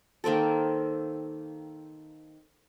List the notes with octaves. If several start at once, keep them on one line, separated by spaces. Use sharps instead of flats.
D#3 A#3 C4 A4